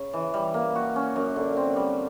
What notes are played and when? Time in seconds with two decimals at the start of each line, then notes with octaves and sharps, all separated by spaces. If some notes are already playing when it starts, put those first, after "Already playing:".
Already playing: C#3
0.13 E3
0.34 G3
0.54 A#3
0.75 F#4
0.96 C#4
1.16 F#2
1.36 D3
1.57 C4
1.76 G3